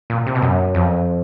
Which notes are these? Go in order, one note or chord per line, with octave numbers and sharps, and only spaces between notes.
A#2
C3
B2
F#2
F2